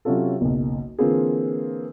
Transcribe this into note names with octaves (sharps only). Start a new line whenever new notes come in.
C3 F#3 C#4 F4 A4
F#1 B1
D3 E3 A#3 C4 F4 G#4